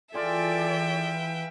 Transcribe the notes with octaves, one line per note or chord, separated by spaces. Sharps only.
E3 F4 G#4 A4 B4 D5 E5 G5